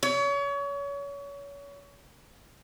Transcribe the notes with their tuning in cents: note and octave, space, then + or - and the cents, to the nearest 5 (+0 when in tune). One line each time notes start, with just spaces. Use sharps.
C#5 +30